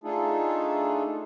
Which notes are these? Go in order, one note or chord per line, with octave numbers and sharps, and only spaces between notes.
A3 D4 D#4 F4 G#4 A4